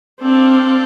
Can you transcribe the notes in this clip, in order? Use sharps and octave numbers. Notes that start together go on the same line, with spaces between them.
C4 D4 A4 D5 F5